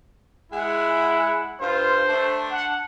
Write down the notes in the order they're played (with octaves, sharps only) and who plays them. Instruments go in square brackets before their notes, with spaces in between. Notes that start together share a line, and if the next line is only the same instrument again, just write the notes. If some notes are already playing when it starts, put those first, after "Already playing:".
[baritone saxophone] G#3 [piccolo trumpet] E4 [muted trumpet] F#5
[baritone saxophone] G2 [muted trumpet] F4 [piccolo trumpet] C5
[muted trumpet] A3 [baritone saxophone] D4
[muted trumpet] F#5